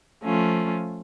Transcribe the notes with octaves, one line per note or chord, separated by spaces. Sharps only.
F3 A3 C#4 F4